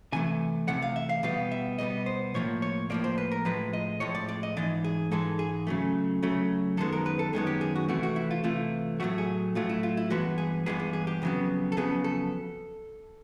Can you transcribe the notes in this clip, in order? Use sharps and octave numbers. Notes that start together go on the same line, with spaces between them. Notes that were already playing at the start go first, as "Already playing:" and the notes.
C3 E3 A3 G#5
C3 E3 A3 F#5
F5
E5
F5
B2 G3 B3 F5
E5
B2 G3 B3 D#5
C5
A2 F3 A#3 C#5
C#5
A2 F3 A#3 D5
C5
B4
A#4
A2 F3 G#3 B4
D#5
A2 F3 G#3 C#5
D5
D5
D#5
G#2 E3 G#3 D5
G#4
G#2 E3 G#3 A4
G#4
C#3 F#3 A3
C#3 F#3 A3
F#2 D#3 G#3 B3 A4
A#4
B4
A4
F#2 D#3 G#3 B3 G#4
G4
G#4
F#4
C3 E3 A3 F#4
F#4
E4
F4
C3 E3 A3 F4
A2 F#3 A3 F#4
G#4
A2 F#3 A3 F4
E4
F4
E4
G2 E3 G#3 B3 F#4
G#4
G2 E3 G#3 B3 G#4
G#4
G#4
G4
F2 C#3 F#3 B3
A4
F2 C#3 F#3 B3 G#4
A4